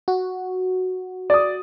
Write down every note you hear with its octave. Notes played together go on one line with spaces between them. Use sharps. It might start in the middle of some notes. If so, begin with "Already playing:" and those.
F#4
D5 D#6